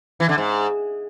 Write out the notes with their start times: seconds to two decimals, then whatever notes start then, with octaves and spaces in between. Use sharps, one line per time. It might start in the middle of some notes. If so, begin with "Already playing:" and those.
0.20 E3
0.29 D3
0.38 G#2